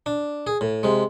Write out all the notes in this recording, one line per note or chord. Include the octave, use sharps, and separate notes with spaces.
D4
G#4
A2
C3 G#3